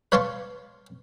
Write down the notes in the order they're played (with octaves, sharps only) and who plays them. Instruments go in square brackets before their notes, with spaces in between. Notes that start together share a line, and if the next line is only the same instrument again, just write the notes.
[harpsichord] B4 C#5 F5 A5 C6 C#6